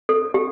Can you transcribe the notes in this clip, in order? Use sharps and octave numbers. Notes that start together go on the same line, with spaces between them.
A4
G4